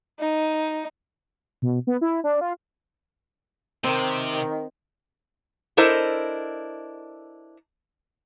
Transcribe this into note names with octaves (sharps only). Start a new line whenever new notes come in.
D#4
B2
B3
E4
D4
F4
C3 D#3 C4
D4 E4 A4 A#4 C5 D#5